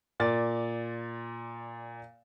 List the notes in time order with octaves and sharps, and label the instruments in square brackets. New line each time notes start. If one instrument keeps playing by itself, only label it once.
[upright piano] A#2 D5 A6